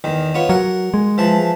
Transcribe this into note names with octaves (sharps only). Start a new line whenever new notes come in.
E2 D#3
B3 F4 C#5
F#3 A#4 F#5
G#3
E3 F3 A5